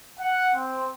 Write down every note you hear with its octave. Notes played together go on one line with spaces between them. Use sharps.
F#5
C4